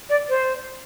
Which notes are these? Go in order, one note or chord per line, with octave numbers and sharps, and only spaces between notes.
D5
C5